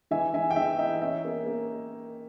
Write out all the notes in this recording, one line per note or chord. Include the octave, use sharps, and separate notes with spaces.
E3 E5 G#5
E3 E5 G#5
G5
E3 E5
D#4 E5
C#4 E5
A#3
A#3